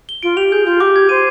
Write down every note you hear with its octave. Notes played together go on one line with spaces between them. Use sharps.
G7
F4 D7
G4 F7
G#4 G6
F4 G6
G4 D6
G#6
C5 D#7